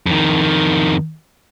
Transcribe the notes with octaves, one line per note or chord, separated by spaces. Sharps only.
F2 D#3